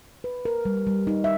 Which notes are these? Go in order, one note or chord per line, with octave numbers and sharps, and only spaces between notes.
B4
A#4
G3
G3
D#4
E5